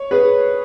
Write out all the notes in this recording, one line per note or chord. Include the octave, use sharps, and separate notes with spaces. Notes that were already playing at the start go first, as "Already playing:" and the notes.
Already playing: C#5
G#4 B4